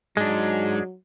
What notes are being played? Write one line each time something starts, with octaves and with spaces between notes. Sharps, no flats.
G#2 F#3 G#3 D4